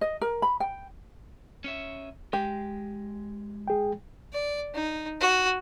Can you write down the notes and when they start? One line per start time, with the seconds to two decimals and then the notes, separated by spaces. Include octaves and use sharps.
0.01 D#5
0.21 A#4
0.42 B5
0.60 G5
1.64 C#4 C#5 E5
2.33 G#3 G4
3.68 G#4 G5
4.33 D5
4.74 D#4
5.20 F#4